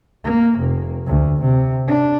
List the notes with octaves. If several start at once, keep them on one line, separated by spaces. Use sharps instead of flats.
A#3
F1
D2
C3
D4